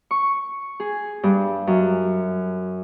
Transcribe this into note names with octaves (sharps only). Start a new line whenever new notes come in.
C#6
G#4
G2
F#2